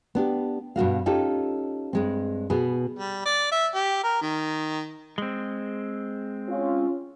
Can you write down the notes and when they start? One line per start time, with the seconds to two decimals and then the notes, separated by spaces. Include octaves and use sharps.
0.15 B3 D4 G4
0.76 G2 B2 F#4 F5
1.06 C#4 D#4 F4 G4 A4
1.93 G2 G#3 C4
2.50 B2 B3 G#4
2.97 G3
3.26 D5
3.51 E5
3.75 G4
4.04 A#4
4.22 D#3
5.18 G#3 C4
6.49 C#4 F4